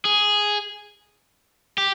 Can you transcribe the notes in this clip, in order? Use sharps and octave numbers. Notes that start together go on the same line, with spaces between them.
G#4
G4